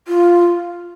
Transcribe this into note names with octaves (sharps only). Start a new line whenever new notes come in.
F4